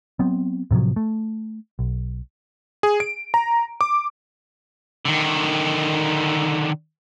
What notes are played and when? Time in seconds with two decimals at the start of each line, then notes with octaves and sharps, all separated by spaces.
0.19 F#3 B3 C4
0.71 A2 C3 F3 F#3
0.96 A3
1.79 B1
2.83 G#4
3.00 D7
3.34 A#5
3.81 D6
5.05 D3 D#3